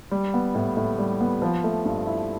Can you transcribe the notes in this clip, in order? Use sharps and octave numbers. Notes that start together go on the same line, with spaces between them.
G3
B3
A2
A2
G3
B3
F3
A3
G2
E4